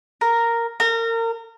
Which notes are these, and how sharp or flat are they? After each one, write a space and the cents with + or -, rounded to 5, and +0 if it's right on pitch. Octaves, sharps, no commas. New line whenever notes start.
A#4 -5
A#4 -30